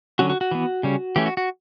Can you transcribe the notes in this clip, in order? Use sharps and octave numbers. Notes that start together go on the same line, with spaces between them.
D3 F#3 C#4 F#4
F#4
F#4
E3 B3
C#3 G3 C#4
E3 A3 C#4 G4
F#4
F#4